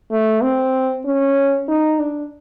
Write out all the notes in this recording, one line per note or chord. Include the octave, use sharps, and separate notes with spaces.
A3
C4
C#4
D#4
D4